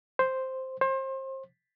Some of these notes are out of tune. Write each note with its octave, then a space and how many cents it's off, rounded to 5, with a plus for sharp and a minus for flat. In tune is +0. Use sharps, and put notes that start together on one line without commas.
C5 +0
C5 +30